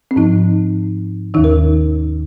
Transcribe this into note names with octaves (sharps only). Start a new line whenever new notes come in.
C4
G#2 F3 D#4
D#2 D#3 D#4
A#4